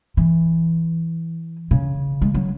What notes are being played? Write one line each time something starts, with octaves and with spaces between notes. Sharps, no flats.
E3
C#3
G#3
F#3